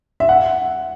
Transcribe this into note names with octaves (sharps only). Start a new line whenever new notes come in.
E5
F#5